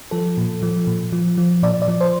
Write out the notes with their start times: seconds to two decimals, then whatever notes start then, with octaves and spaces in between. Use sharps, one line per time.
0.11 F3 A4
0.37 A#2
0.63 F3
0.87 A#2
1.12 F3
1.38 F3
1.63 A#2 D5
1.82 D5
1.88 F3
2.01 C5